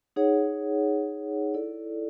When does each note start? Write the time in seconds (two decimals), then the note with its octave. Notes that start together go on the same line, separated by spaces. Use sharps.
0.16 D#4 G#4 C#5 F#5
1.54 E4 A4 D5